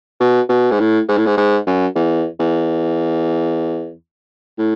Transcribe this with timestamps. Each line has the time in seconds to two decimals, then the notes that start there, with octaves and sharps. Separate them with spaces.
0.20 B2
0.49 B2
0.71 G#2
0.80 A2
1.09 G#2
1.17 A2
1.26 G#2
1.37 G#2
1.67 F#2
1.95 E2
2.40 E2
4.58 A2